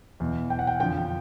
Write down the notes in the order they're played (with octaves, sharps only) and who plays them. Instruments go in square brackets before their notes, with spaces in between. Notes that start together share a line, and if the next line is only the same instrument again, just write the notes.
[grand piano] E2 B2
G5
F#5
G5
F2 D3 F3 G5